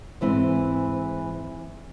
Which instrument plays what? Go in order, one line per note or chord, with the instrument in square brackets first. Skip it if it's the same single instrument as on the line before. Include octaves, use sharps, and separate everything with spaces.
[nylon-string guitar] G#2 E3 C4